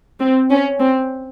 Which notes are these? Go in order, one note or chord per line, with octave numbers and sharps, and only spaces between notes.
C4
C#4
C4